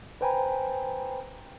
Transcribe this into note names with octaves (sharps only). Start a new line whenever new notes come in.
B4 C5 G5 G#5 A#5 B5